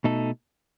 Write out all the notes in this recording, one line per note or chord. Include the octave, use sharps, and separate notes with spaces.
B2 A3 D#4 A4